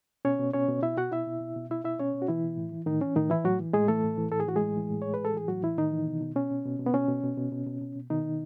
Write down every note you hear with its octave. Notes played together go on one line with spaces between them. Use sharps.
B2 C#4 C#5
B2
B2 C#4 C#5
B2
B2 E4 E5
B2 F#4 F#5
B2 E4 E5
B2
B2
B2
B2 E4 E5
B2 E4 E5
B2 C#4 C#5
B2
F#4
B2 E3 E4
B2
A2
E3
A2 D#3 D#4
E3 C#4
A2 D#3 D#4
E3 E4
A2 F#3 F#4
E3
A2 G#3 G#4
E3 A3 A4
A2
E3
A2 A4
G#4
E3 F#4
G#3 G#4
A2
E3
A2
E3 C#5
B4
A2 A4
E3 G#4
A2 F#3 F#4
E3 E4
A2 D#3 D#4
E3
B2
B2
B2 C#4
B2
B2
B2
B3
B2 C#4
B2
B2
B2
B2
B2
B2
B2
B2 D#3 D#4
B2